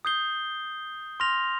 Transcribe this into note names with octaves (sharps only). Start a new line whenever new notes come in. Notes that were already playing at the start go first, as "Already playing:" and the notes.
D#6 G6 C7 G7
C6 F6 A#6 F7